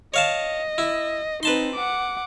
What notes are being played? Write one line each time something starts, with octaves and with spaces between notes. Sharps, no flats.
C#5 D#5 F5 A5
E4
C4 D#4 B4 A5 C6
F#5 D6